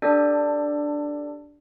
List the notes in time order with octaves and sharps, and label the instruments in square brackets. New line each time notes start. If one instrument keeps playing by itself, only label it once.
[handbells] D4 G4 A4 D5